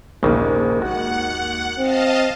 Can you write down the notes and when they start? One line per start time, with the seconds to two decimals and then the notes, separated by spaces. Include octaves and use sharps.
0.23 A#1 D#2 G#2 C#3
0.82 F#4 F#5
1.78 C4 D#5 F5 A5